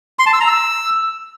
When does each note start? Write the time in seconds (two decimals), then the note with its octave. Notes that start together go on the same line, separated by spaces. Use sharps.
0.19 C6
0.26 A5
0.33 E6
0.41 A#5
0.48 E6